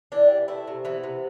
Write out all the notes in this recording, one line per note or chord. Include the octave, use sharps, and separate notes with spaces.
E3 D4
C3
A3 E4
C3
E3 B3
C3